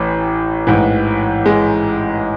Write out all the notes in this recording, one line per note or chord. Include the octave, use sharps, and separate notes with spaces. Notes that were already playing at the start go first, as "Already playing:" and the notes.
Already playing: A1 A2 E3
A1 G#2 E3
G#3